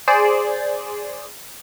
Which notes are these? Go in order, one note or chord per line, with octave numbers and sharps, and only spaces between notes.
G#4 C5 D5